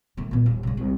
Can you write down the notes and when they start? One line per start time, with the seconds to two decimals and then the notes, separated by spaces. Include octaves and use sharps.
0.17 D#3 A3
0.31 A#2 B3
0.46 D#1
0.63 C#3 G#3
0.77 C2